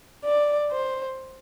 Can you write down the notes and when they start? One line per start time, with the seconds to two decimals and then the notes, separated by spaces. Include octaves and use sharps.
0.24 D5
0.71 C5